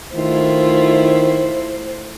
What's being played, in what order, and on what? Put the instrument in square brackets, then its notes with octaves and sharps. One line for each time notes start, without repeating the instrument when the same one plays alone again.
[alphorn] D#3 [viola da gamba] A3 E4 F4 [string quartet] C5